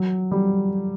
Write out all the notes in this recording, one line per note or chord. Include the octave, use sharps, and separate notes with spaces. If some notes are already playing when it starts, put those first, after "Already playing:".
Already playing: F#3
G3